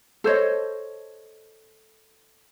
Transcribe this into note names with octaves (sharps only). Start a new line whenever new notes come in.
A4 C5 C#5 D#5